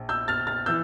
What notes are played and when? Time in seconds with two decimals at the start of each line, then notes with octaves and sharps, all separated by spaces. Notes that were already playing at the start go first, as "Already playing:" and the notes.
Already playing: A#1
0.09 E6 G6
0.28 F6 A6
0.47 F6 A6
0.66 E3 E6 G6